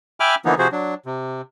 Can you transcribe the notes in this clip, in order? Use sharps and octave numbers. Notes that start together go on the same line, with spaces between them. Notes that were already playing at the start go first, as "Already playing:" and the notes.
E5 G5 G#5 B5 D6 F6
D3 E3 F3 A#3 B3 D#4
C3 F3 F#4 G#4 C5
F#3 D4
C3